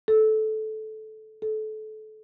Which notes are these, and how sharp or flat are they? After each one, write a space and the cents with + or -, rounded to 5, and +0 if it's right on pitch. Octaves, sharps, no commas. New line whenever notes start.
A4 -15
A4 -25